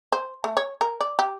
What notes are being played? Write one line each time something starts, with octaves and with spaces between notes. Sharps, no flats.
C5
A3
C#5
A#4
D5
G4